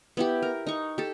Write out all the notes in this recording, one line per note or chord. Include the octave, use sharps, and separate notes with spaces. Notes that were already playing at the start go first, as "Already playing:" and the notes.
B3 E4 G4
A#4
D#4 C#6
G4 A4